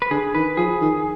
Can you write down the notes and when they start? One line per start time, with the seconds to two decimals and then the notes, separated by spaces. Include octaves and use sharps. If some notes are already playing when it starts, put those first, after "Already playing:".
0.02 B4
0.11 D3 G#4
0.35 D#3 B4
0.57 F3 G#4
0.81 D#3